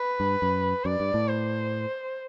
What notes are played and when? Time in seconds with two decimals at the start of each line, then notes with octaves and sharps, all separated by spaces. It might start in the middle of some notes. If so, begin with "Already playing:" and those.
Already playing: B4
0.20 G2
0.42 F#2
0.85 F#2 D5
1.00 G2
1.14 A2
1.28 C5